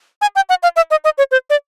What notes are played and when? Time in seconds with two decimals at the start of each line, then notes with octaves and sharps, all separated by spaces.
0.22 G#5
0.36 G5
0.49 F#5
0.63 F5
0.76 E5
0.91 D#5
1.04 D#5
1.18 C#5
1.31 C5
1.50 D5